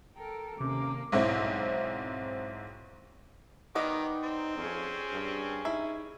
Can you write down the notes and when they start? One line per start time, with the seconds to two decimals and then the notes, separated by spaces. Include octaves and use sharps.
0.14 A4 A#4 G5
0.60 D#2 C3 A#3 C#4 D6
1.12 B1 G#2 C4 E4
3.75 D#3 G3 B3 D#4 D#5 D6
4.23 C4
4.57 F2 C#4 G#4
5.12 G2
5.65 D#4 E4